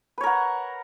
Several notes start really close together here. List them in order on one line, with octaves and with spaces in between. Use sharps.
B4 C#5 A#4 F#5